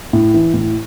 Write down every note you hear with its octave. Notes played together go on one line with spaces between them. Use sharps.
A2
E3
A2